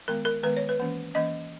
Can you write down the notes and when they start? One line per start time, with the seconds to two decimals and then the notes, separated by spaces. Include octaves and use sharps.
0.08 D#3 G#3 B3 A#4
0.25 A#4
0.44 D#3 G#3 B3 B4
0.57 C#5
0.69 B4
0.80 E3 A#3 C#4
1.14 E3 A#3 C#4 D#5